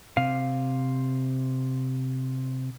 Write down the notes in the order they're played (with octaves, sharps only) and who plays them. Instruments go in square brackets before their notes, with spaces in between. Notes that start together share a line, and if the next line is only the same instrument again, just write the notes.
[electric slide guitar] C3 F5